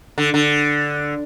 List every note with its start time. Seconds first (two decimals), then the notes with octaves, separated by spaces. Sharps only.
0.18 D3
0.34 D3